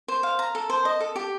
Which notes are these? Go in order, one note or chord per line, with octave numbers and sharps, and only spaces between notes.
C5
F5
A#5
A4
C5
D#5
A4
G4